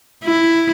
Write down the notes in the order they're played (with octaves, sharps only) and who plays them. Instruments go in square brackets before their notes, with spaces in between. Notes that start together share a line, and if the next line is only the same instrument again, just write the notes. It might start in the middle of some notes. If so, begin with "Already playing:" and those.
[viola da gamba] E4